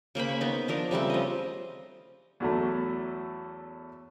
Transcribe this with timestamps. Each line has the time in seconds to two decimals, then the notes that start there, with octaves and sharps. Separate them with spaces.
0.15 C#3 A#3 C5 B5
0.29 C#6
0.41 B3 D#4
0.68 F3 D4 A#4
0.91 C#3 G3 A3 C4
1.10 F3 D#5
2.40 E2 F#3 A3